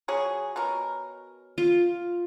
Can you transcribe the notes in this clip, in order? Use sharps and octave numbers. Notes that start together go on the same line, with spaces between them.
F#3 C#4 G#4
B2 C#4 A#4
F4